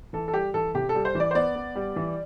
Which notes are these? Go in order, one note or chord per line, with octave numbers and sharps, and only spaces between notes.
E3 A4
A4
G3 G4
E3 A4
C3 G4
A4
G3
C5
E3
D5
C5
B3 D5
B3
G3
E3